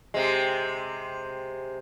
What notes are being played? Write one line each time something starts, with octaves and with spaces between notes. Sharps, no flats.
C3 G#3